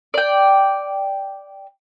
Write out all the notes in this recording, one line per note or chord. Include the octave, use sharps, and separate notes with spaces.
D5 G5